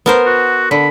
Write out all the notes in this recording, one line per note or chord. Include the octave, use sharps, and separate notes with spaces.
B3 A#4 C5
F#4
D3 B5